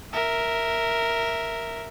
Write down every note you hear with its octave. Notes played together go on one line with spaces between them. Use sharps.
A#4 E5